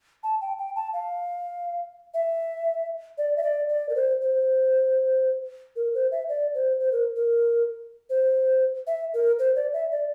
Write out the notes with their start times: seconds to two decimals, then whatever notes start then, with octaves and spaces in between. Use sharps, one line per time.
0.23 A5
0.41 G5
0.58 G5
0.76 A5
0.93 F5
2.14 E5
3.18 D5
3.37 E5
3.43 D5
3.69 D5
3.89 A#4
3.95 C5
4.21 C5
5.76 A#4
5.94 C5
6.11 E5
6.29 D5
6.54 C5
6.80 C5
6.92 A#4
7.16 A#4
8.10 C5
8.87 E5
9.14 A#4
9.39 C5
9.56 D5
9.73 E5
9.92 D5